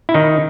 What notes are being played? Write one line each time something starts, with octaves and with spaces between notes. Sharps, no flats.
E4
D#3 D#4